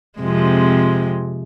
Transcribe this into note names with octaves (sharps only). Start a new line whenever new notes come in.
F2 C3 G#3